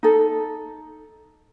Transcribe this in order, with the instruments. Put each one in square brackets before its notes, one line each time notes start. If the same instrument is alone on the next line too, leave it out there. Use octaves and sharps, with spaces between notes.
[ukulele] D#4 A4